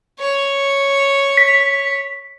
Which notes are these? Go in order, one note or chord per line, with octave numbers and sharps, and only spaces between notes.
C#5
B6